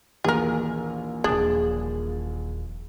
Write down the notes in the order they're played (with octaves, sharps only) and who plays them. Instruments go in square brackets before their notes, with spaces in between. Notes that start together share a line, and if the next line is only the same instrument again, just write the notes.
[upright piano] A#1 D#2 E3 [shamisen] G#4 A#4
[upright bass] D#1 F3 [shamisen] D4 [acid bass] G#4